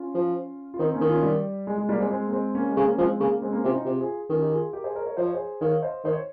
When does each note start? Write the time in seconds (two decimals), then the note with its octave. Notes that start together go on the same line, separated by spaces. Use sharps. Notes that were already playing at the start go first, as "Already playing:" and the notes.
Already playing: C#4 F4
0.14 F3
0.74 F4
0.79 D#3 C4 D#4
0.94 A#3 C#4
1.01 D#3
1.09 C#4 F4
1.23 G3
1.67 G#3
1.78 G#3
1.89 G3 A#3
2.00 G#3 C4
2.11 G#3 C4
2.27 A#3
2.32 G#3 C4
2.55 A#3 C#4
2.69 G#3
2.76 C#3
2.79 C4
2.84 A#3 C#4
2.98 F3 G#3 C4
3.20 C#3 A#3 C#4
3.42 G#3 C4
3.53 A#3 C#4
3.64 C3 C#4 F4
3.75 D#4 G4
3.85 C3 F4 G#4
4.00 F4 G#4
4.29 D#3 C#4 F4
4.41 D#4 G4
4.51 F4 G#4
4.73 G4 A#4
4.84 G#4 C5
4.95 A#4 C#5
5.06 A#4 C#5
5.17 F3 C5
5.26 C#5
5.34 G#4 C5
5.61 D#3 C#5 F5
5.82 C5 D#5
6.04 D#3 C5
6.12 C#5